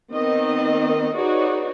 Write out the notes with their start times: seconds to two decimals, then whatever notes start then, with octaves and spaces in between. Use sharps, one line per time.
0.12 D#3 B3 C4 D#4 D#5
1.16 D#4 F#4 G#4 B4 C#5 D5